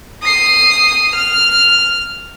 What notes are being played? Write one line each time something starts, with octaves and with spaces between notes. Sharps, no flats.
D#6 C7
F6